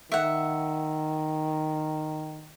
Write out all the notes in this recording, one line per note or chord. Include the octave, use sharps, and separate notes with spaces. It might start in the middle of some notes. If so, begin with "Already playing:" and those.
D#3 E5 F#5